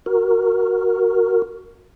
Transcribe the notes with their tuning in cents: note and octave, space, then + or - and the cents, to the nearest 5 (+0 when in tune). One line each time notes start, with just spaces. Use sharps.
F#4 +0 A#4 +0